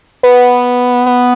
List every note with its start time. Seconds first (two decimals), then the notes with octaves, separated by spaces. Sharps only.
0.23 B3
1.06 B3